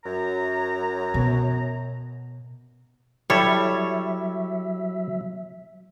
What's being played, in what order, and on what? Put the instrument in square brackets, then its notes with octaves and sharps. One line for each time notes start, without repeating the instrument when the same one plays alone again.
[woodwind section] F#2 A#5
[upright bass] B2
[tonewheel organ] F#3 E5 [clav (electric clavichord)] G3 E4 A4 [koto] C#5